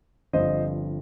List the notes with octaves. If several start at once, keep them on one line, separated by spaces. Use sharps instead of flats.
G1 G2 F3 C4 C5 D#5